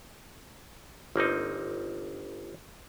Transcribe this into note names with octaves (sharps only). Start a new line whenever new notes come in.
G1 A#3 C4 D#4